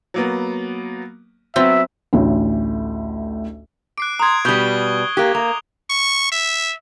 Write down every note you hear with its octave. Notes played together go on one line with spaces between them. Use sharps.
F#3 A#3 B3
F#3 B3 C4 E5
A1 D2 A2
D6 F#6 C7 D7
A#5 C6 D#6 G#6
B2 G3 C#6 D#6 G6 G7
A#3 G4 F#6
A#3 A#5 F7
C#6
E5